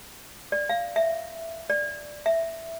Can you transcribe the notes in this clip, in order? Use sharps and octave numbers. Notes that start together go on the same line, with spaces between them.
D5
F5
E5
D5
E5